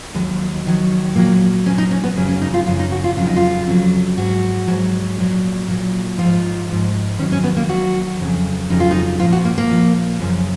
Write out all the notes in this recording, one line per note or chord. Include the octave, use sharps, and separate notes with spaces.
D#2 D#3 F#3 G#3
D#2 D#3 F#3
A#2 F#3 A#3
A#2 F#3 C#4
D#4
C#4
B3
F#2 C#3 F#3 C#4
C#4
D#4
F4
F#2 C#3 F#3 F4
D#4
F#4
F4
F2 C#3 F#3 F4
D#4
F4
F2 C#3 F#3
G#2 F#3 F#4
G#2 F#3
A#2 F#3
A#2 F#3
G#2 F3 F4
G#2 F3
D#2 D#3 F#3 C#4
C#4
B3
A#3
D#2 D#3 F#3 F#4
F2 C#3 F#3
F2 C#3 F#3 D#4
F4
D#4
A#2 F3 F4
F#4
A#3
A#3
A#2 F3
F#2 C#3 F3